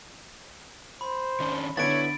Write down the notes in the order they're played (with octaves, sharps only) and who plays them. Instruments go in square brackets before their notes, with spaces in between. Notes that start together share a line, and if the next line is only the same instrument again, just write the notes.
[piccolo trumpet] C5 [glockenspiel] B5
[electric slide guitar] D#3 C#4 D4
[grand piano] D3 B3 [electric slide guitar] E4 [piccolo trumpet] C#5 [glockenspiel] A6 D7